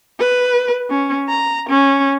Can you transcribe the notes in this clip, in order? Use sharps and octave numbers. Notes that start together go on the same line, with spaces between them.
B4
C#4
A#5
C#4